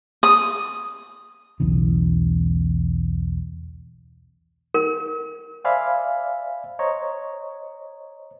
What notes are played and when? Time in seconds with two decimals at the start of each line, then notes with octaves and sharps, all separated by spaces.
0.23 D#6
1.60 B1 E2 C#3 E3
4.74 A#4
5.65 C5 D5 E5 F5 G#5 B5
6.79 C5 C#5 D#5 A#5